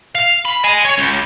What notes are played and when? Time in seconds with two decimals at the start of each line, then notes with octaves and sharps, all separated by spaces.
0.15 F5
0.45 B5
0.64 D#5 G#5
0.85 C#5
0.98 C#2